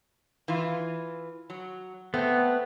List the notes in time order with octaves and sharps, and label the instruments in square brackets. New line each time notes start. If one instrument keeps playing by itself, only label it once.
[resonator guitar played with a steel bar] E3 F4
F#3
[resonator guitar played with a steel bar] A3 C4 [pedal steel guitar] B3